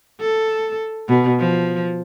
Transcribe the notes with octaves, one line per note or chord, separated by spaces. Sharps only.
A4
B2
F3